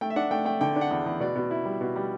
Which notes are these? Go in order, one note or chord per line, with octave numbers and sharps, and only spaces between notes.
A3 G5
E5
D4 F#5
A3 G5
A3 G5
D3 G5
D4
F#5
E2
E2
B2 D5
B2
E4
G3
B2
G3